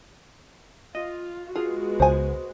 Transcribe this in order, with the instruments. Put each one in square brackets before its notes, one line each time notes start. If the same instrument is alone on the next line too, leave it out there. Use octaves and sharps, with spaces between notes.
[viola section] F4 [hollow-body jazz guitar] D#5
[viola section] G#3 B3 F#4 [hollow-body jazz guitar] F4 [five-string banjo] G#4
[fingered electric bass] C#2 [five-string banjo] C5 G#5